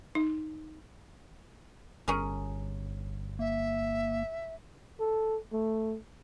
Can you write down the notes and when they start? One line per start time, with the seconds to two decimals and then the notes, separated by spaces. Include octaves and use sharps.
0.15 D#4
2.08 G1 C#4 G#4 A#4
3.39 A#3 E5
5.00 A4
5.53 A3